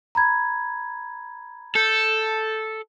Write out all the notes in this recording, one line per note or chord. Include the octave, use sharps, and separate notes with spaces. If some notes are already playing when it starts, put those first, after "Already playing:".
A#5 B5 G#6
A4 G6